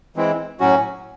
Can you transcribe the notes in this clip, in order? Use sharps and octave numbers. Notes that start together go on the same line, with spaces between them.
E3 G#3 C4 E4
A2 F#3 C#4 F#4